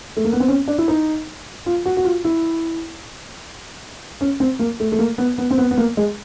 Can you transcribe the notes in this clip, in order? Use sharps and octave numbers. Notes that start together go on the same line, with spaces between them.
A3
A#3
B3
C4
C#4
D4
E4
D#4
F4
F#4
F#4
F4
E4
C#4
C4
A#3
A3
A3
A#3
B3
B3
C4
B3
B3
A#3
G#3